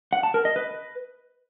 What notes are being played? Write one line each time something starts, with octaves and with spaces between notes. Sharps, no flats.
F#5
A5
A#4
D#5
B4